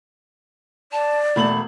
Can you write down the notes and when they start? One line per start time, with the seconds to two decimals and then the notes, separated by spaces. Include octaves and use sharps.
0.92 D5 A5
1.36 E1 A3 B5 F#7